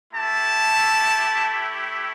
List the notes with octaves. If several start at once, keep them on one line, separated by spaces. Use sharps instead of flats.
A3 E4 G4 A5